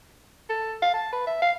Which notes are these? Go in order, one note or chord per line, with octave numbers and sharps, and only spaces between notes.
A4
F5
A5
B4
E5
F5